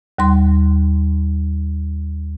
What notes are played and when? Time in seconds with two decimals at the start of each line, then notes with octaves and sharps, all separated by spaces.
0.18 D#2 G3 C6